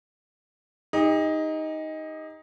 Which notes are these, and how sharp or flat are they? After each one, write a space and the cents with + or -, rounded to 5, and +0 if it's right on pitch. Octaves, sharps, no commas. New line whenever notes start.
D#4 +10 G4 +45